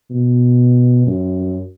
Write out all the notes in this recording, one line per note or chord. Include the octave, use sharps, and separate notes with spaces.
B2
F#2